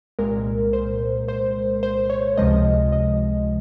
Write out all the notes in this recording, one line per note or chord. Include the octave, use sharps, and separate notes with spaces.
C2 A#2 G#3 A#4
C5
C5
C5
C#5
C#2 C3 F3 G#3 D#5
D#5